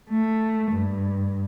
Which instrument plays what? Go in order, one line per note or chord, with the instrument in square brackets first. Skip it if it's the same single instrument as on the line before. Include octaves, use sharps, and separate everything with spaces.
[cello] A3
G2